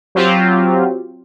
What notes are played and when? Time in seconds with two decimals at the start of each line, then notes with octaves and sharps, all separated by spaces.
0.15 F#3 C4 F4 G4